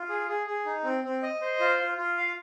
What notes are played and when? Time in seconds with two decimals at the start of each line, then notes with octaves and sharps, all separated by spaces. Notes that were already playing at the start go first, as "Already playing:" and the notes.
Already playing: F4
0.09 G#4
0.28 G#4
0.47 G#4
0.66 D#4
0.84 C4
1.04 C4
1.23 D#5
1.41 C5
1.60 F4
1.79 F4
1.98 F4
2.17 F5